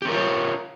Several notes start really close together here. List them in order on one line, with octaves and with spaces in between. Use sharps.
G4 C#4 A#4 F4 C#5